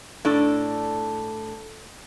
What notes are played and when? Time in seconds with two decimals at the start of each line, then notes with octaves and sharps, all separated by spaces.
0.25 A2 D4 A4